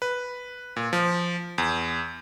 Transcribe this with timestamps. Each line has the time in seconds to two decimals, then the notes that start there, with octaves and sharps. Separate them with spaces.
0.02 B4
0.76 A#2
0.93 F3
1.58 E2